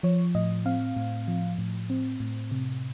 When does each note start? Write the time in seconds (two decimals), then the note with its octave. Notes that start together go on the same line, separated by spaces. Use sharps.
0.03 F3 C#5
0.35 A2 D#5
0.66 C4 F5
0.96 A2
1.28 F3
1.58 A2
1.90 C4
2.20 A2
2.51 C3